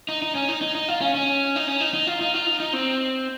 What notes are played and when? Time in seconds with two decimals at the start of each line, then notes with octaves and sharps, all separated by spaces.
0.09 D#4
0.22 D#4
0.35 C#4
0.49 D#4
0.62 D#4
0.75 D#4
0.88 F4
1.01 C#4
1.15 C#4
1.56 D#4
1.68 C#4
1.80 D#4
1.94 D#4
2.07 F4
2.21 D#4
2.34 F4
2.47 D#4
2.60 D#4
2.73 C4